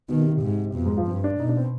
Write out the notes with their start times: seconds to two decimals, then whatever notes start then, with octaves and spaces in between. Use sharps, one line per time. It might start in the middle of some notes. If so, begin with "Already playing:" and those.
0.09 B2 D#3
0.21 C3
0.31 C3
0.42 G#2
0.74 F2 B2
0.86 G#2
0.97 F3
1.07 G2 C4
1.24 D4
1.40 B2 D#4
1.49 D4
1.57 C4